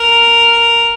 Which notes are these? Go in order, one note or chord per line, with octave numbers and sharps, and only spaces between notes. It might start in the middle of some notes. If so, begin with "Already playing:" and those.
Already playing: A#4